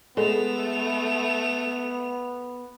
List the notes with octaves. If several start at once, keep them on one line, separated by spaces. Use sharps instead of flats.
G#3 A3 B3 A4 F7